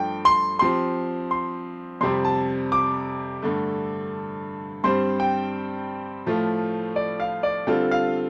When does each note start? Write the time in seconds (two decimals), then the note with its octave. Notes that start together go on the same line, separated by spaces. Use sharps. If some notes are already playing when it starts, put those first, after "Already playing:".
Already playing: G2 F3 A3 D4 G5
0.25 C6
0.59 F3 C4 G4 C6
1.31 C6
2.01 F2 C3 G3 C4 G4 C6
2.25 A5
2.72 D6
3.42 G2 D3 A3
4.84 G2 G3 C4 G4 C5 C6
5.20 G5
6.26 A2 F3 A3 F4
6.96 D5
7.20 F5
7.43 D5
7.67 D3 G3 C4 F4 A4
7.91 F5